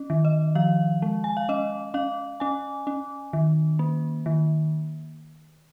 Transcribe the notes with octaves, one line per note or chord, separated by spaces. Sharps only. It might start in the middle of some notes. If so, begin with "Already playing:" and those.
Already playing: C#4
D#3
D#5
F3 F5
G#3
G#5
F5
C#4 D#5
C#4 F5
C#4 G#5
C#4
D#3
A#3
D#3